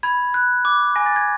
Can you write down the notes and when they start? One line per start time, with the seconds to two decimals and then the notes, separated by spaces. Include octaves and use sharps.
0.03 B5 G#6
0.34 F#6
0.65 D6
0.96 G#5 A#6
1.06 A6
1.16 G#6